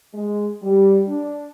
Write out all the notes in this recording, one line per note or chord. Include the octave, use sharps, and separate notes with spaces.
G#3
G3
D4